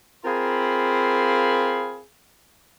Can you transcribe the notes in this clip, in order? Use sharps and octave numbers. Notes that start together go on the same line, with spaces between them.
C4 F4 G#4 A#4 F5 B5